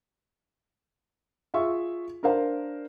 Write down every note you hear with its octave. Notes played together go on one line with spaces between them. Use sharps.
F4 G#4 E5 C#6
D4 A#4 C5 F5